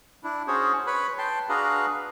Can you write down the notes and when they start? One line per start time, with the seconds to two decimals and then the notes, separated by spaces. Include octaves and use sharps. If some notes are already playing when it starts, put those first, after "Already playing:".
0.24 D4 E4
0.47 C#4 F#4 G#4 C5 C#5
0.87 B4 C#5 B5
1.18 G5 A5 C6
1.49 D4 F#4 G#4 B4 F5 A#5